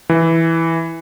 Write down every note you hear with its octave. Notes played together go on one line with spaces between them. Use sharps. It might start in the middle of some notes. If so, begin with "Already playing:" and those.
E3